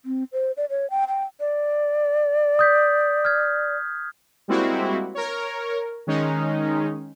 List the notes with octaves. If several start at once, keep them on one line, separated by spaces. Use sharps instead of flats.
C4
C5
D5
C#5
G5
G5
D5
D#6 G6 B6
F6 G#6
G3 G#3 A#3 C4 E4 F#4
A#4 C#5
D#3 G#3 C#4 D#4